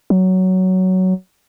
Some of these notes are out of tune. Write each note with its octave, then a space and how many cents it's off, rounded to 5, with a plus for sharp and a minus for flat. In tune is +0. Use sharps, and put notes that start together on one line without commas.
F#3 +10